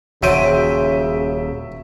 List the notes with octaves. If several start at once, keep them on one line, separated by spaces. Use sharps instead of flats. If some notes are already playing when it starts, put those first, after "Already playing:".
D#1 C#3 F#3 C5 E5 D7 D#7